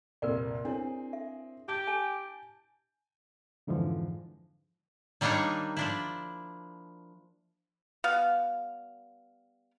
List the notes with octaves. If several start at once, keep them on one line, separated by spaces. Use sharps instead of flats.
C2 F2 A#2 A#4 B4 D5
C4 D4 E4 G#4 C#5
E5
G4 A5 G6
G#5
F2 G#2 D3 E3 F3
D#3 G3 A#3 D4 D#4 C#5
F3 D4 E4
G3 B3 F5